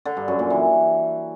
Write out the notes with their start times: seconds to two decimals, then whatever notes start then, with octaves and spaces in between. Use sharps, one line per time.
0.05 D3
0.17 G2
0.28 F#2
0.39 A#2
0.50 E3